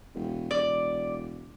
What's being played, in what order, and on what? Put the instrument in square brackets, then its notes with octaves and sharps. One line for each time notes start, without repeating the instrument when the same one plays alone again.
[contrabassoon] E1
[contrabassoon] E1 [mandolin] D5